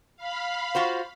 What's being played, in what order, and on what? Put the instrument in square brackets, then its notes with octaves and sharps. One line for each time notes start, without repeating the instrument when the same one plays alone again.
[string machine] F5 B5
[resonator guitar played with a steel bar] F4 F#4 C5